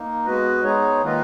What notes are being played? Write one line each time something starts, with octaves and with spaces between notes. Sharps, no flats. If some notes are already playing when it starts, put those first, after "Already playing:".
Already playing: A#3 D#4
G#3 B3 F#4 B4 D#5
G#3 B3 D#4 G#4 C#5
D#3 A#3 F4 B4 D#5